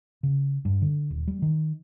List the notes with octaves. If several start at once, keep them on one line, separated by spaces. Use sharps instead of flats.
C#3
G2
D3
D#1
G3
D#3